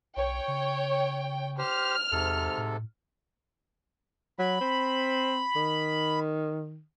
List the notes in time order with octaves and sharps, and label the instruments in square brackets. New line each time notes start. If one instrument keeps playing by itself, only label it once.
[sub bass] B1 [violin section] C#5 G5
[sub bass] C#3
[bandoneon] G4 C5 [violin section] F6
[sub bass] E2 [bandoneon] G#2 C3 A4
[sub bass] A2
[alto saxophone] F#3 [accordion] B5
[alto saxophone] C4
D#3